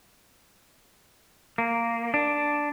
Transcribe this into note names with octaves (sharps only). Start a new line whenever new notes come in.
A#3
D4